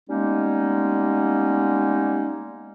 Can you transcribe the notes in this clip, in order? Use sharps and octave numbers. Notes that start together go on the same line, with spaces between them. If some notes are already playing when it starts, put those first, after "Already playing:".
G3 G#3 A#3 B3 C#4 D#4